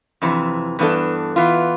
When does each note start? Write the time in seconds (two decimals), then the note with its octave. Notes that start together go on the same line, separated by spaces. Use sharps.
0.22 F2 C3 E3
0.79 G2 E3 B3 D4 A4
1.36 E3 B3 F4